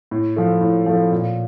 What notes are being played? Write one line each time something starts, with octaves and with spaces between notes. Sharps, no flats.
A2
F3 A3
A2
F3 A3
A#2